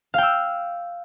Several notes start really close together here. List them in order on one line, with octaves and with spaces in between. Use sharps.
F5 G5 E6